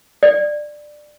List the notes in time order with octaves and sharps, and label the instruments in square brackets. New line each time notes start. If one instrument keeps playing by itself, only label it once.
[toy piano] D5